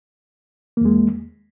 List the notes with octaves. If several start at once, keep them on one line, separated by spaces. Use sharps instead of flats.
E2 G#3 A#3